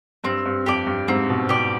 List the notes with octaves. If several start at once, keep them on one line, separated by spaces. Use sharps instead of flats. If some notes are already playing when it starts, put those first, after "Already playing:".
G2 C4
G2
F2 G4 D5
G2
G#2 C4
B2
B2 G4 D5